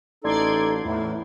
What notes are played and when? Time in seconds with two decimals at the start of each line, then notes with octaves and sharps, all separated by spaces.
0.24 A1 D#4 A4 D5 C6 G#6
0.85 E2 A2 E4